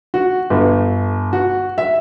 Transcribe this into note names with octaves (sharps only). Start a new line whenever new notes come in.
F#4
G1
F#4
E5